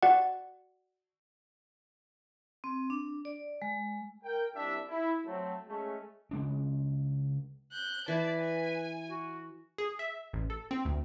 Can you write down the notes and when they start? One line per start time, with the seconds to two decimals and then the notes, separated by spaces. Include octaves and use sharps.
0.03 F#4 D5 F#5
2.64 C4
2.90 D4
3.25 D5
3.62 G#3
4.24 A#4 G5
4.55 C2 D4 E5
4.88 E4
5.26 F#3 A3 C4
5.67 G#3 A3 C#4
6.31 C#3 G#3 D4
7.72 F#6 G6
8.08 E3 B4 D5 A5
8.39 G#5
9.09 F#4
9.78 G#4
9.99 E5
10.33 A1
10.50 A4
10.71 C4
10.85 D2